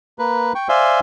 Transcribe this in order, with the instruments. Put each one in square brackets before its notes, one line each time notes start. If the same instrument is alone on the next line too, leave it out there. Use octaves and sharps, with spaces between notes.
[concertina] A#3 B4
G5 C#6
C5 D5 E5 F5 G#5